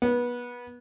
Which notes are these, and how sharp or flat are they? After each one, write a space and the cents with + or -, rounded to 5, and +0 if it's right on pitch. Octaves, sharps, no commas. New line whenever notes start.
B3 -25